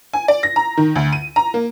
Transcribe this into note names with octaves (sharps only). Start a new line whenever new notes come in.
G#5
D5
A#6
A#5
D#3
D2
D#7
A#5
A#3